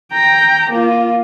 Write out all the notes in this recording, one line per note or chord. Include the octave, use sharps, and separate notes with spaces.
G5 A#5
A#3 F4